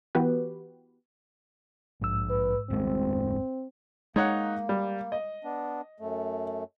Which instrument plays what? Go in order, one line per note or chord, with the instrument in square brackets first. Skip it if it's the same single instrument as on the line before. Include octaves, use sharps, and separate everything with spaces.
[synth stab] E3 B3 F#4 G4 B4
[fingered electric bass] A#1 [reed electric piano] G#2 E6
[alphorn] B4
[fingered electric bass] D#1 G#1 G#3 [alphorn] C4
[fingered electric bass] G#3 [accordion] A#3 [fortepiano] D#4 C#5 F#5
[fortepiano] G3
D#5
[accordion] B3 D4
F#2 A3